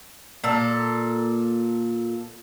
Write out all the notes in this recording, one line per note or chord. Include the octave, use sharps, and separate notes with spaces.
A#2 A4